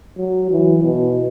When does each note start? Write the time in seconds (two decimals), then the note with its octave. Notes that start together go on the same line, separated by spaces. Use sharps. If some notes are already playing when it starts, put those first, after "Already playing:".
0.18 F#3
0.51 E3
0.83 B2